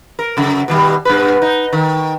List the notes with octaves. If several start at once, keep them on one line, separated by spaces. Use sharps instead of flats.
A#4
F#2 C#3
B2 D#3 G3
G2 B2 B4
D#4
D#3